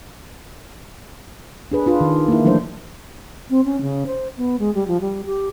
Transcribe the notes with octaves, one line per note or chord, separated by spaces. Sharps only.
D4 G#4 B4
D4 F4 B4
D#3
A#3 E4
E3 F#3 A3 D4 C5
C4
C#4
C#3
C5
B3
G#3
G3
F3
G3
G4